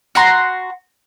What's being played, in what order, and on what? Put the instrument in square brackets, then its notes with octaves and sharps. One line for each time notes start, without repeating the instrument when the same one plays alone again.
[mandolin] F#4 F#5 A#5 C6